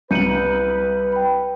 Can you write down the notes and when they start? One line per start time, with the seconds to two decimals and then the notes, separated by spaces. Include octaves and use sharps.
0.11 C2 B4 G6 C#7 D#7 F#7
1.12 G5 B5